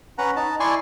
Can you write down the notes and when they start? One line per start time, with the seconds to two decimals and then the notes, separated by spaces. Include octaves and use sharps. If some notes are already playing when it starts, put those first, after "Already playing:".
0.18 C#4 B4 F#5 A#5
0.36 D#4 A5
0.60 E4 D5 G#5 C6 C#6